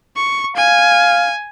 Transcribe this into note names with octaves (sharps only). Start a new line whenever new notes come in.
C#6
F5 G#5